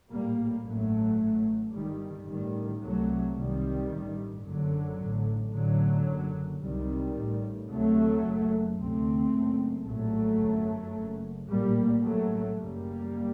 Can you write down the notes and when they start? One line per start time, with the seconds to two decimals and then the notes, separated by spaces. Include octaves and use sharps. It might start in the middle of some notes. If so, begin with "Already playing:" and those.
0.10 A#1 A2 G3 A#3
0.65 A1 G2 F#3 A3
1.20 A1 A2
1.73 G1 G2 D#3 G3
2.28 A1 A2 D#3 G3
2.81 C2 C3 F#3 A3
3.36 C2 C3 D#3 G3
3.90 A1 G2
4.45 F#1 F#2 D3 F#3
4.99 A1 A2
5.52 A1 A2 D3 F#3
6.07 F#1 F#2
6.61 C2 C3 D#3 G3
7.16 A1 A2
7.70 D2 C3 F#3 A3
8.24 F#1 F#2
8.78 D2 C3 A3 C4
9.33 F#1 F#2
9.86 A#1 A2 F#3 A3
10.41 G1 F#2
10.95 F#1 F#2
11.49 A#1 A2 G3 A#3
12.03 A1 A2 F#3 A3
12.57 F#1 F#2 G3 A#3